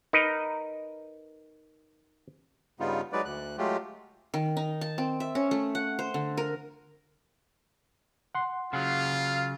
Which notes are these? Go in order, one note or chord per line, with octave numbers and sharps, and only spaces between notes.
D#4 A#4 B4 D#5
G2 C#3 G3 B3 D#4 F4
F#3 G#3 D#4 B4 D5
D2 F#6
F#3 G#3 A3 F4 G4
D#3
D#4
A5
C4
E5
C#4
A3
F#5
C5
D3
A#4
F#5 C6
C#3 F#3 F4 F5